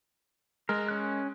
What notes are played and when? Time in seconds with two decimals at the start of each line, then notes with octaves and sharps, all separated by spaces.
0.69 G#3 A#4
0.88 C#4 F#6